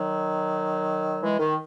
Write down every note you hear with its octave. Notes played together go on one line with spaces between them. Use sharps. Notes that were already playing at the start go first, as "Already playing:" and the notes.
Already playing: D#3 F#3
E3 G#3
D#3